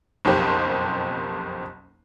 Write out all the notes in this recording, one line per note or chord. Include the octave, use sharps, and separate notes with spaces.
F#1 B1 F2 A#3 G4 C5